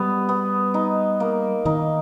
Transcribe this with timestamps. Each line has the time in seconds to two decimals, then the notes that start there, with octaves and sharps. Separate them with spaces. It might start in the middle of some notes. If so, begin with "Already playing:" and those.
Already playing: G3 B3
0.29 B3
0.74 D#4
1.20 A#3
1.65 D#3 D#4